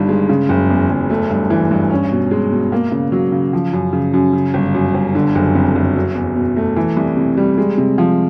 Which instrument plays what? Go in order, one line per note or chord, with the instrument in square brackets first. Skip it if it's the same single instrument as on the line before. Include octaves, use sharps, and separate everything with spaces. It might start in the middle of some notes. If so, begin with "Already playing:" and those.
Already playing: [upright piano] G1 G2 D#3 G3
G#3
C#3
F#1
E2
F#1
A3
G2
E3
G2
C#4
B2
G#3
B2
A#3
C#3
F#3
C#3
F3
F#2
C#3
F#2
C#3
G1
F#2
G1
D3
F#1
F2
F#1
F#3
E2
B2
A3
E3
C2
C3
G3
G#3
C3
F3